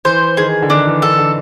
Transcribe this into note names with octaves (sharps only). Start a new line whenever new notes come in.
E3 C5
D#3 G#4
D3
D#3 D4
E3
D3 A4
D3